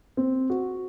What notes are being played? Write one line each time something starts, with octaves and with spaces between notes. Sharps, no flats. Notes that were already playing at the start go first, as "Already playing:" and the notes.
C4
F#4